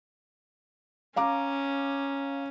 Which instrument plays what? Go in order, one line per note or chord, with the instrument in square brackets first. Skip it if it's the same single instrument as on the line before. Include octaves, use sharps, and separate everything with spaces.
[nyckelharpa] C#4 [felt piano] F5 A#5 D6